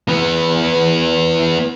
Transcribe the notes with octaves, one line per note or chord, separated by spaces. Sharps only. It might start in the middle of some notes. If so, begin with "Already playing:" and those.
E3 B3